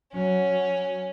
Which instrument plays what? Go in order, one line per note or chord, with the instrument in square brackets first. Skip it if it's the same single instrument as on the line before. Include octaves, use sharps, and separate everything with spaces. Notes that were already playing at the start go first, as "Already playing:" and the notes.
[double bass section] F#3 [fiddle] C#4